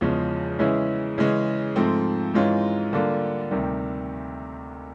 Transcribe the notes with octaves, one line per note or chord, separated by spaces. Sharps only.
E2 C#3 F3 G#3 C#4
C#3 E3 G#3 C#4 E4
C#3 E3 G#3 C#4
G#2 F3 A3 C4
G#2 E3 G#3 C#4 F4
D3 G3 A#3 D4 F4
D2 C3 D#3 G3